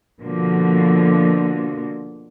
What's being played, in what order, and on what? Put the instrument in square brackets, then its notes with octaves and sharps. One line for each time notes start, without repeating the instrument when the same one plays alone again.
[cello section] B2 D3 F3 A#3